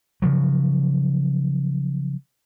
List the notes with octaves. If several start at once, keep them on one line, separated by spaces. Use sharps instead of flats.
C#3 F3 F#3